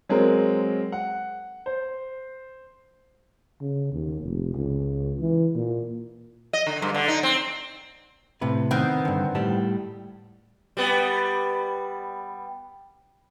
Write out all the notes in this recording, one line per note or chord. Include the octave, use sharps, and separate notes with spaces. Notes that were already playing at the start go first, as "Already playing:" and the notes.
F#3 G#3 C4 A#4
F#5
C5
C#3
D#2
F1
C#2
E3
A#2
D#5
D3
G2
D3
D#4
C4
A2 C3 B4
D#3 B3 C4
G2 D3
A2 G3 A5
G3 B3